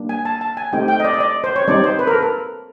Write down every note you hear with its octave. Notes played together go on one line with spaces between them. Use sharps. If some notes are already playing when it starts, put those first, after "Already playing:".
Already playing: G3 A#3 D4
G#5
A5
A5
G#5
A3 C4 D#4 G4 G5
G5
D#5
D5
D#5
D5
C5
C#5
G3 C4 D#4 D5
C5
B4
A#4
A4
A#4